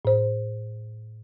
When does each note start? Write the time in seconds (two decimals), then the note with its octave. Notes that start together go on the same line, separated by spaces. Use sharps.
0.05 A2 C5